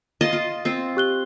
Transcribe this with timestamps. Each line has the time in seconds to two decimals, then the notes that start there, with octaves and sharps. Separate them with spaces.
0.21 F4 D#5 A5
0.33 F4
0.65 C4 F4
0.97 G4 F#6 G7